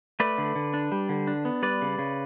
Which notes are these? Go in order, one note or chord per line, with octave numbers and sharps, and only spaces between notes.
A3 B4 D5
D3
D3
D4
G3
D3
D4
B3
G3 B4 D5
C#3
C#3